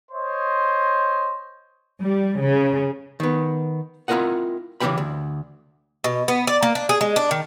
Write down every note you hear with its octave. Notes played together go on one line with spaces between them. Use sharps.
C5 C#5 D#5 C6
G3
C#3
D#3 B3
C4 E4 F4 A#4 D#5 F#5
C#3 E3 D4 G4 G5 B5
D2
B2
B3
D5
A#3
D4
G#4
G#3
D4
D#3